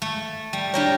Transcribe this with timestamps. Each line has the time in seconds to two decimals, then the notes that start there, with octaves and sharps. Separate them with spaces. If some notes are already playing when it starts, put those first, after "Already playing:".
0.02 A3
0.53 G3
0.74 G3 D4 G4 A#4 C#5